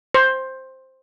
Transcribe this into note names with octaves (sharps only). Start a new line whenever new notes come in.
C5